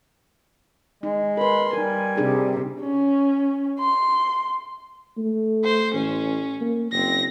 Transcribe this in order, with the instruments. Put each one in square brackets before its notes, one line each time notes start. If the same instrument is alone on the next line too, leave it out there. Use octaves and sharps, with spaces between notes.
[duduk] G#3 [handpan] D#4
[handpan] A#4 B4 [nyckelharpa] B5 C6
[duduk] G3 [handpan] D#4 A#4 [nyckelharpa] G#5
[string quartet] C3 [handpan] D4 D#4 G#4
[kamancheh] C#4
C6
[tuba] A3
[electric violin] C5
[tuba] A1 [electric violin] C#4
[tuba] A#3
[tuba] F#1 [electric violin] C4 A#6